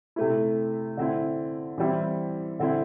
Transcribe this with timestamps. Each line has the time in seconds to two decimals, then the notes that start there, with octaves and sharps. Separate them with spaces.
0.16 C3 A3 E4
0.97 D3 C4 E4
1.78 E3 G3 C4 E4
2.60 D3 C4 E4